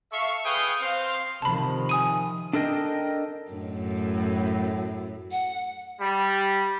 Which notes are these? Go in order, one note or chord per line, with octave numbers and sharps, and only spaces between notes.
A4 E5 F5 C#6
G#4 B4 F5 G5 C#6 D#6
C4 C5 F5
C3 D#3 F3 A5 B5
G#5 D#6 D#7
D4 A4 A#4 D#5 G5
F#2 A2
F#5
G3